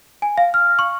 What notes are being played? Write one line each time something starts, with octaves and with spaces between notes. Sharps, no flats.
G#5
F5
F6
C#6